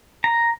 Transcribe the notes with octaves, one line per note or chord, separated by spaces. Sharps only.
A#5